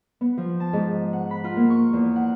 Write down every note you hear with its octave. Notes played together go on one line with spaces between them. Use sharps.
B3
F3
A5
G#2
F#5
B5
F4
A#3
C#6
E2
F#5